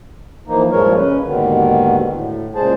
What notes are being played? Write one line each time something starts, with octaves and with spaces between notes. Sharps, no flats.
E3 F3 A#3 D#4
G2 A#2 F3 G#3 A#4 C#5
C#3 C#4 B4
D#2 G#2 B2 D3 D#3
A2
A#2 C#3 G#3 G#4 C5 A5